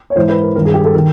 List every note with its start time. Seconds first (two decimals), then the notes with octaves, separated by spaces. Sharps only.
0.10 C#5
0.16 G#2 E3 C5
0.29 B4
0.43 A#4
0.55 D#3 A#4
0.60 G2
0.65 G#4
0.74 G4
0.85 A4
0.94 D#3 A#4